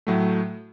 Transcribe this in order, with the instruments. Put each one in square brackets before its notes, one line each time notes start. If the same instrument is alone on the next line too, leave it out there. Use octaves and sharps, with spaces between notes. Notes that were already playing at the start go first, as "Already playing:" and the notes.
[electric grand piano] A2 F#3 A3